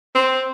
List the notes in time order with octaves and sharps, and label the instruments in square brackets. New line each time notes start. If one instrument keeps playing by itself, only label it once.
[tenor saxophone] C4